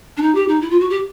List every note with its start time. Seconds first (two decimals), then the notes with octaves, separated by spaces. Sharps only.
0.17 D4
0.22 D#4
0.35 G4
0.48 D#4
0.61 E4
0.70 F4
0.80 F#4
0.90 G4